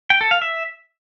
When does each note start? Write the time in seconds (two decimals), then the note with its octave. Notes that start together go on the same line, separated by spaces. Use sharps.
0.10 G5
0.21 A4
0.31 F5
0.41 E5